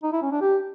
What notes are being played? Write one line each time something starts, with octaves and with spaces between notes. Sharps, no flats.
D#4
E4
C#4
D4
G4